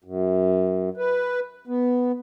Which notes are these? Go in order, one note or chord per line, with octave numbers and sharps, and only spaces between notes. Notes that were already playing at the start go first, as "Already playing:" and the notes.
F#2
B4
B3